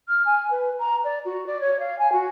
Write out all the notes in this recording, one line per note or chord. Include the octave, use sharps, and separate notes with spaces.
F6
G#5
B4
A#5
D5
F#4
D5
C#5
F5
G#5
F#4